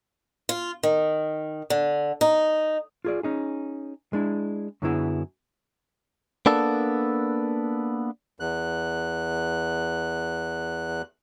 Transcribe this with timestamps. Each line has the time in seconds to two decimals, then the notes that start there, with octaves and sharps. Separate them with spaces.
0.49 F4
0.83 D#3
1.70 D3
2.21 D#4
3.05 F4 G#4 D5
3.23 C#4 D#4 G#4
4.13 G#3 D4 E4
4.82 F#2 D3 F#3 B3 E4 G#4
6.46 A#3 B3 D4 A4
8.40 E2 F#6